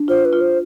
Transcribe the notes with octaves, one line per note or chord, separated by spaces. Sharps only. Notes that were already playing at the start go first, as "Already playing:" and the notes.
Already playing: D4
F4 C5
B4
F4
C5